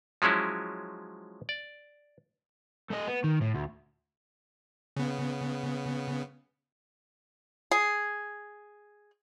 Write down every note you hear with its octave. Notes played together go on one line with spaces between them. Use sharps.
F3 F#3 G#3 C#4 E4
D5
A3 D#5
B3
D#3
A2
D2
C#3 B3
G#4